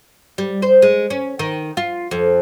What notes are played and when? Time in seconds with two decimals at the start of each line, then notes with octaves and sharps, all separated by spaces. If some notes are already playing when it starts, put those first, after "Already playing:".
0.38 G3
0.62 C5
0.82 G#3
1.10 C#4
1.39 D#3
1.77 F4
2.11 F2